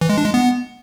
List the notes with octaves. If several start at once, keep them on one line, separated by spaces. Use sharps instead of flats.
E3
G#3
D4
G#3
B3